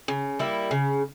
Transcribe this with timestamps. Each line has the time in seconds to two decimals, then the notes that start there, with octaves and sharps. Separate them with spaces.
0.08 C#3
0.39 G3 A#3 E4
0.71 C#3